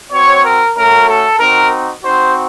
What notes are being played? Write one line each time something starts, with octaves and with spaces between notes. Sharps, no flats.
C4 F#4 C#5
A#4
A3 C#4 F#4 A#4
A4
C4 D#4 F#4 A#4
C4 D#4 F#4 C5